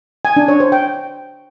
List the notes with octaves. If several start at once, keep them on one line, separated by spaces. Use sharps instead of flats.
G#5
D4
C#5
C5
G5